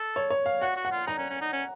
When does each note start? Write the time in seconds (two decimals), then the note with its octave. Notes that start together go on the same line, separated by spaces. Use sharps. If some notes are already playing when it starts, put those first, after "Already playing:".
Already playing: A4
0.16 C#5
0.30 C#5
0.46 F5
0.61 F#4 F#5
0.76 F#4
0.85 F#5
0.92 F4
1.07 D#4 A#5
1.18 C#4
1.30 C#4
1.41 D#4
1.53 C#4